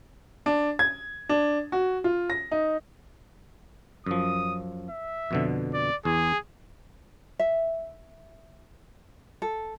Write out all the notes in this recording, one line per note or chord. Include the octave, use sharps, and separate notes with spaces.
D4
G#6
D4
F#4
F4
A#6
D#4
F#2 F3 D#6
E5
F2 B2 D3
D5
E2 G#4
E5
A4